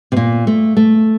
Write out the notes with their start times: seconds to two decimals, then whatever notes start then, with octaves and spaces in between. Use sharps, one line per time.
0.12 C3
0.16 A#2
0.47 A3
0.77 A3